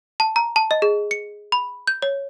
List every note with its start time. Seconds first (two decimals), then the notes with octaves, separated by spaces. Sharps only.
0.20 A5
0.36 A#5
0.56 A5
0.71 D#5
0.82 G#4
1.11 C#7
1.52 B5
1.87 G6
2.02 C#5